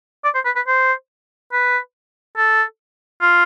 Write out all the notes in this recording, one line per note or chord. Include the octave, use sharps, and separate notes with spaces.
D5
C5
B4
B4
C5
B4
A4
F4